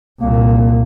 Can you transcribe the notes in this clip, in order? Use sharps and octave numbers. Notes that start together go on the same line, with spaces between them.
C2 A#2 A#3